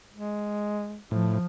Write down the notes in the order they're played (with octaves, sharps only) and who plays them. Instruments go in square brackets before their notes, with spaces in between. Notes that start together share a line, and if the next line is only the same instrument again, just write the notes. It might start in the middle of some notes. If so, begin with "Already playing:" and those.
[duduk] G#3
[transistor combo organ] A2 [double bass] F3